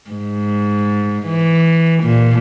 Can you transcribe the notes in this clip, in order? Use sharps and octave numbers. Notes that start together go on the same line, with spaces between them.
G#2
E3
A#2